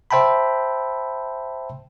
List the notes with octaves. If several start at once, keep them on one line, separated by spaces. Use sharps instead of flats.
C5 E5 G5 A5 B5